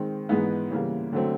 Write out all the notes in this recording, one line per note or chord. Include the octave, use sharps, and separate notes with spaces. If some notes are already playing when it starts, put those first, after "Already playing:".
Already playing: D#3 G#3 C4
G#2 E3 G#3 B3 D#4
C#3 E3 G3 A#3
D3 F#3 A3 C4